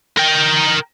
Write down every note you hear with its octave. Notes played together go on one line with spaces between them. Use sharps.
A#4 G5